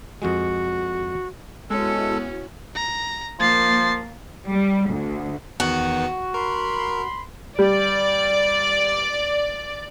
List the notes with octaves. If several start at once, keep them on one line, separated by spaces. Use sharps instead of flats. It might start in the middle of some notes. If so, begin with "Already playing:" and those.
F2 G#3 F#4
G#3 B3 C#4 E4 F#4 A4
A#5
F3 A#3 A6 C7
G3
D2
E2 D#3 B3 F#4
A#4 B5 C6
G3 D5